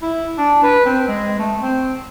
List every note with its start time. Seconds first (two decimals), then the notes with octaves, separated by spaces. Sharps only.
0.02 E4
0.38 D4
0.63 B4
0.86 C4
1.08 G#3
1.38 A3
1.62 C4